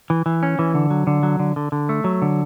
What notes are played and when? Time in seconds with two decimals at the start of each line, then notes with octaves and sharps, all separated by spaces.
0.10 E3
0.26 E3
0.43 C#4
0.59 E3
0.75 D3
0.90 F#3
1.07 D3
1.23 F#3
1.39 D3
1.56 D3
1.72 D3
1.89 A3
2.04 F#3
2.22 D3